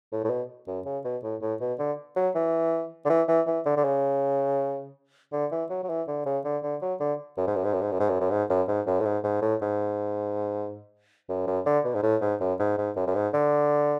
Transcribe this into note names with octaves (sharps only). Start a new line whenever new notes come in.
A2
A2
B2
F#2
C#3
B2
A2
A2
B2
D3
F#3
E3
D3
E3
E3
E3
D3
D3
C#3
D3
E3
F#3
F#3
E3
D3
C#3
D3
D3
F#3
D3
F#2
G#2
F#2
G#2
F#2
G#2
F#2
G#2
F#2
F#2
G#2
F#2
G#2
F#2
A2
G#2
G#2
A2
G#2
F#2
F#2
D3
B2
G#2
A2
G#2
F#2
G#2
G#2
F#2
F#2
G#2
D3